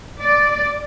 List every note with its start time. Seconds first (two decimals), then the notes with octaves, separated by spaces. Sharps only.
0.21 D5